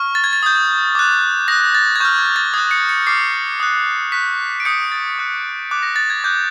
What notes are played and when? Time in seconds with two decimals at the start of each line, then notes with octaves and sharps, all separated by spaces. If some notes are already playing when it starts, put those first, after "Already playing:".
Already playing: C#6 F6
0.15 A6
0.24 G#6
0.33 A6
0.43 D#6 G6
0.95 D6 F#6
1.48 D#6 F#6 A#6
1.75 A6
1.96 G#6
2.00 C#6 F6 G6
2.18 G#6
2.36 A6
2.54 D#6 F#6 G#6
2.71 C#7
2.89 C#7
3.07 D6 F6 C7
3.60 D#6 F#6
4.12 C#6 F#6 B6
4.60 D7
4.65 D#6 G6 C#7
4.92 A6
5.18 C#6 F#6
5.71 D6 F#6
5.83 A#6
5.96 A6
6.10 G#6
6.24 D6 F#6 G6